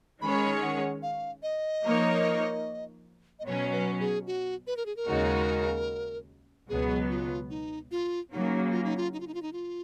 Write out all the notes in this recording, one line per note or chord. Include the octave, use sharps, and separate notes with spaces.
D#3 G#3 C#4 G#4 C#5 B5
F#5
F5
D#5
F3 A#3 D#4 A#4 C#5
D#5
B2 F#3 C#4 C#5
B4
G#4
F#4
B4
A#4
G#4
A#4
D#2 C#3 G#3 D#4 F#4
C#2 B2 F#3 B3 G#4
F4
D#4
F4
C#3 F#3 A#3 D#4
F4
D#4
F4
D#4
F4
D#4
F4
D#4
F4